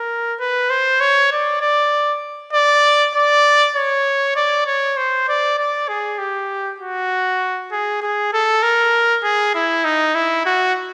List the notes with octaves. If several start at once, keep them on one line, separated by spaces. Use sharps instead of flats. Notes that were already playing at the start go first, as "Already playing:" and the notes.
Already playing: A#4
B4
C5
C#5
D5
D5
D5
D5
C#5
D5
C#5
C5
D5
D5
G#4
G4
F#4
G#4
G#4
A4
A#4
G#4
E4
D#4
E4
F#4